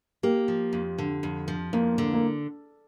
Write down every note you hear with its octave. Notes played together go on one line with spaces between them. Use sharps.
A#3 G4
F3
F2
D3
F2
F3
F2 A#3
D3
A#3